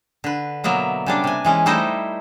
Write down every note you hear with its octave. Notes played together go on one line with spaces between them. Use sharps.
D3 B4
B2 F#3 A#3 B3 E5
C#3 G3 D4
C3 G#5
E3 G#3 C#4
G3 A3 D#4 E4 C5 D#5